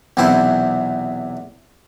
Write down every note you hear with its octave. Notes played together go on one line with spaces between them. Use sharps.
B1 E2 C3 C4 E4 E5